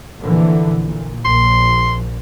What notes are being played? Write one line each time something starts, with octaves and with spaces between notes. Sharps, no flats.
A#1 D3 E3
A#2
A#1 C6